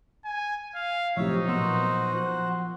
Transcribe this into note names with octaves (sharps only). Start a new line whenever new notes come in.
G#5
F5
A2 C3 F3 F#3 D#4 C#5 E5
A#2 A#3 B3 F#4 C5 F#5 E6
F3 F#6